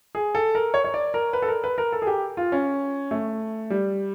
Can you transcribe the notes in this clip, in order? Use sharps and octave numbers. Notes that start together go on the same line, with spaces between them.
G#4
A4
A#4
C#5
C#5
D5
A#4
B4
A4
A#4
B4
A#4
A4
G#4
G4
F4
C#4
A3
G3